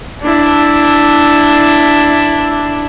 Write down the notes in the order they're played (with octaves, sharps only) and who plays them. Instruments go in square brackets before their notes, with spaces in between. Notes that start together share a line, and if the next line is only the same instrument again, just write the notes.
[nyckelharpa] D4 E4